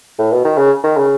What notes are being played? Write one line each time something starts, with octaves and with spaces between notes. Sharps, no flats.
A2
B2
D#3
C#3
D#3
C#3